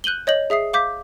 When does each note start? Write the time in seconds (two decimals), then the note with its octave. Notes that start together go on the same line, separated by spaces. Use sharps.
0.04 F#6 G6 D#7 F#7 G7
0.27 C#5 D#5 G6 F#7
0.50 G#4 E5 D#6 C7
0.73 F5 D6 G6 B6